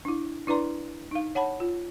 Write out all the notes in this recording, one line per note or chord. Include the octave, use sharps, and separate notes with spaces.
D4 E4
D4 E4 B4 D5 A#5 C6
D#4 F5
C#5 F#5 A5 B5
F4